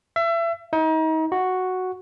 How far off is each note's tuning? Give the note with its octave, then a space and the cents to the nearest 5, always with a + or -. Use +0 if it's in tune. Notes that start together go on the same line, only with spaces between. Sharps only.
E5 +30
D#4 +35
F#4 +0